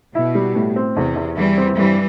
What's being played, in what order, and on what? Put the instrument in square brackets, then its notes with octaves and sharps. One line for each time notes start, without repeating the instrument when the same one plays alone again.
[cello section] B2 [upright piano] E4
[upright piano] G3
A2
C4
[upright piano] E2 [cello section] C3
[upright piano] E2
[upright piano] E2 [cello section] E3 G3
[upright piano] C4
[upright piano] G2 [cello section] E3 G3